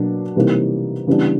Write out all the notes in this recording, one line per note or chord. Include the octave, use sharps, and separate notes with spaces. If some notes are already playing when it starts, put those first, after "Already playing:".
Already playing: B2 F#3 A#3 D4
C3 E3 G3 A#3 D#4
C#3 E3 G3 B3 D4